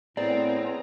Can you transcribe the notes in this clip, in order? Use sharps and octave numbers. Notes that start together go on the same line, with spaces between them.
A2 B3 C4 G#4 D5 A#5